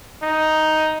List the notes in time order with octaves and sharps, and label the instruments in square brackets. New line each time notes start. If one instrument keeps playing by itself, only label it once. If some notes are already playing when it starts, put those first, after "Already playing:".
[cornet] D#4